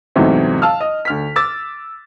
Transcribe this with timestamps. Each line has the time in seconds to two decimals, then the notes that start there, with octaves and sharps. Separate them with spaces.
0.16 E2 G#2 C3 F#3 A3 C4
0.62 F5 A5 E6 F6
0.81 D#5
1.05 D2 F6 B6
1.36 D6 E6 A6